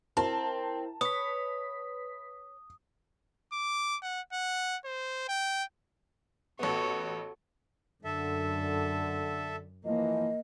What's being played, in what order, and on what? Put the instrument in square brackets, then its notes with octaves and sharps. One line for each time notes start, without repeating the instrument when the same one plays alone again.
[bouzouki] C4 [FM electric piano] E4 A#4 [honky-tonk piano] A5
[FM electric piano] B4 B6 [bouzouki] C#5 [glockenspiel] D#6
[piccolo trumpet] D6
F#5
F#5
C5
G5
[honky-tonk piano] A1 B3 [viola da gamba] F#4 A4 C#5
[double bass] F#2 [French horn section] D3 [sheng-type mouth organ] A4 E5
[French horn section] E3 F3 [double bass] A#3 [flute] D#5